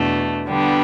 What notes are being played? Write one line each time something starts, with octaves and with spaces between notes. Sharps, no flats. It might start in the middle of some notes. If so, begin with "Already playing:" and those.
Already playing: E2 B2 A3 D4
D3 G3 B3